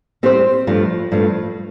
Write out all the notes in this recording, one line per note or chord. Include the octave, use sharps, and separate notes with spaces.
G3 C4 G4 C5
G2 F3 A3
G2 F3 A3